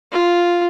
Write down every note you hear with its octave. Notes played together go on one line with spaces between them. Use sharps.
F4